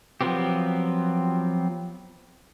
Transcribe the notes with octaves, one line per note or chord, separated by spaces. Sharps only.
F3 F#3 B3 C4 G4